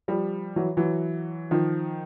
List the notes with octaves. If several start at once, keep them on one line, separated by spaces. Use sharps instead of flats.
F3 G3
E3 F#3
E3 F#3
D#3 F3